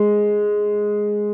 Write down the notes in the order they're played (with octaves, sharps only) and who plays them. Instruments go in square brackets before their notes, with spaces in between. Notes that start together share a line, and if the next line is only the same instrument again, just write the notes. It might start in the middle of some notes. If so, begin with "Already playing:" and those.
Already playing: [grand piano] G#3